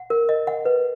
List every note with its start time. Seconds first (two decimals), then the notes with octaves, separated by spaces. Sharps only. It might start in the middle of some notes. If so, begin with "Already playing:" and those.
Already playing: F#5
0.10 A#4
0.29 D#5
0.47 F#5
0.65 B4